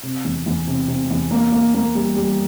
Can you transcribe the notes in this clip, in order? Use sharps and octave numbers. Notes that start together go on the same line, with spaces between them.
C3
E2
E2
C3
C3
E2
A#3
A#3
A#3
G3
G3